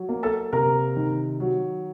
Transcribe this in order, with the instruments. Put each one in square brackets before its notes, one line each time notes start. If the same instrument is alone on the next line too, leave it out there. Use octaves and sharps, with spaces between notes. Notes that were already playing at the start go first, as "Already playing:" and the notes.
Already playing: [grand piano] F#3
A#3
A4 A5
C3 A#4 A#5
D#3
F#3